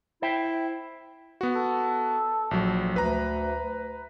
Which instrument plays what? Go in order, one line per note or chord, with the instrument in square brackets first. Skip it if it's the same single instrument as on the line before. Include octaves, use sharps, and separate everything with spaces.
[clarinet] E4 [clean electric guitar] C5 E5 G5
[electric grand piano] B3 F#4
[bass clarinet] A4
[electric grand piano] A#1 F#3
[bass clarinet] D2 [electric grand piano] B4 A#5